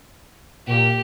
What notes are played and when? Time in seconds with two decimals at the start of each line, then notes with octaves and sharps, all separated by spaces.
0.67 A#2 G4